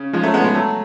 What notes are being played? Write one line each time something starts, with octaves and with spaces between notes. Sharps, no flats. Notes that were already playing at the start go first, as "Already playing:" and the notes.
Already playing: C#3
F3 G#3
F#3 A3
G#3 B3
G#3 B3
F#3 A3